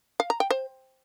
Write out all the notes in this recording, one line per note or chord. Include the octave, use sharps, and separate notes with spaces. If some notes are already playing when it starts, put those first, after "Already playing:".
F5
A#5
G5
C5